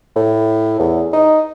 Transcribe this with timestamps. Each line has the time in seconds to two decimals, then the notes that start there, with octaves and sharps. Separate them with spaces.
0.16 A2
0.79 E2
1.13 D#4